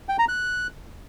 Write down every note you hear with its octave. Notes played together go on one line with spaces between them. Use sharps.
G5
A#5
F#6